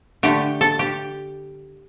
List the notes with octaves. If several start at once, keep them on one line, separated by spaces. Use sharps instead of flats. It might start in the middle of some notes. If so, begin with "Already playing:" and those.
D3 A3 G4
A4
G4